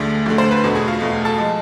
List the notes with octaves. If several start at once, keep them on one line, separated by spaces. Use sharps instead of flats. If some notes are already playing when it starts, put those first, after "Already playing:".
Already playing: D2 D3 A3 G#4
D2 D3 A3
C5
B4
E2 B2 A3
G#4
F4
E2 B2 A3
A4
F3 G#3